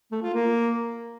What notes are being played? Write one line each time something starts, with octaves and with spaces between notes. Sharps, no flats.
A3
F4
A#3